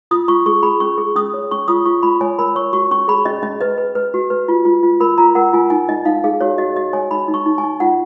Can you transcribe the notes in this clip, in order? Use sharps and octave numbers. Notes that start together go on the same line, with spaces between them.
F4 D#6
F4 C#6
G#4 C#6
G#4 B5
C#4 C#6
G#4
C#4 D#6
C#5
C#4 C#6
F4 D#6
F4 C#6
F4 B5
C#5 G#5
A#4 B5
C#5 C#6
F#4 C#6
C#4 C#6
G#4 B5
C#4 D#5
C#4 D#5
B4 D#5
B4
B4
F#4
B4
F4
F4
F4
A#4 B5
F4 A#5
A#4 F#5
F4 G#5
D#4 G#5
D#4 D#5
D#4 F5
G#4 F5
F#4 C#5
F#4 D#5
F#4 D#5
C#5 G#5
D#4 B5
D#4
C#6
D#4
G#5
D#4
F4 F#5